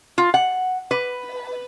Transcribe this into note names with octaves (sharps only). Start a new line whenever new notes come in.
F4
F#5
B4